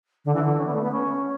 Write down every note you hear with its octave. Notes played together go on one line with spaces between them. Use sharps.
D3
E3
D3
C#4
B3
A3
B3
C#4